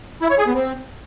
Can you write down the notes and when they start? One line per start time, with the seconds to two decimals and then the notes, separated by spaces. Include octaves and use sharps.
0.22 E4
0.30 C#5
0.38 G#4
0.46 B3
0.55 C4